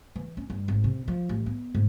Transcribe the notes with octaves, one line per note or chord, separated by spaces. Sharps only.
E3
C#4
G2
G#1
C3
F3
A1
B3
G#2